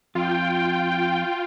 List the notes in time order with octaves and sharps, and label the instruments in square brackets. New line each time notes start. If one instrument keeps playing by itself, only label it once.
[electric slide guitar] F2 [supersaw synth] F4 [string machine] G5